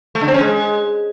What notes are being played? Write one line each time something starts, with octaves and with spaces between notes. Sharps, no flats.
A3
D3
C4
C#4
G#3